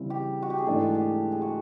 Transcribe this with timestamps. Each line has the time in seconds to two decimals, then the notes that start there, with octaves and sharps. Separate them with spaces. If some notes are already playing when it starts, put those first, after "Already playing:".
Already playing: C#3 E3 G3 C4
0.10 G4
0.42 F#4
0.50 G4
0.58 G#4
0.67 G#2 E3 A3 D4 A4
0.81 G#4
0.95 G4
1.32 G#4
1.42 F#4